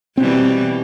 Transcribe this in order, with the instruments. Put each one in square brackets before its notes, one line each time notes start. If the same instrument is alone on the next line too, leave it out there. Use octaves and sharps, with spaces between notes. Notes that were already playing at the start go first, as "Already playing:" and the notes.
[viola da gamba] B2 E3 G3 [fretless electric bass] C4